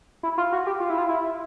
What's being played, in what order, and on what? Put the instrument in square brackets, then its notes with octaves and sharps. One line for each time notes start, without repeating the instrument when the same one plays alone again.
[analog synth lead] E4
F4
F#4
G4
F4
E4
F4
E4